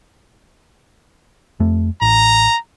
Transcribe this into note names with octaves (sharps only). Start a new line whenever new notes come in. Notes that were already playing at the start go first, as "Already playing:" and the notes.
F2 A3
A1 A#5